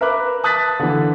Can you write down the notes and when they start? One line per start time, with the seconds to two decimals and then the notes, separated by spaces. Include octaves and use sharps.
0.01 A#4 B4 E5 B5 D6 F#6
0.44 A5 D#6 F#6 A6 B6
0.80 D3 E3